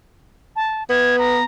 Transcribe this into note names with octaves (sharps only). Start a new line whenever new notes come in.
A5
B3 G#6
A#5